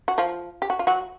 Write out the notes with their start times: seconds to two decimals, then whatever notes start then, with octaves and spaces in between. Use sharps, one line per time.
0.08 F#4
0.18 F3 F4
0.62 G4
0.70 F#4
0.79 F4
0.87 F#3 F#4